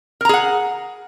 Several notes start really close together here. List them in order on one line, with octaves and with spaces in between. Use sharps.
A#4 A#5 G#4 F#5